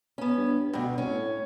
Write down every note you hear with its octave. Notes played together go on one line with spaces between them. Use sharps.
B3 C#4
G2
D2 G2 B2
C2 C#4
A2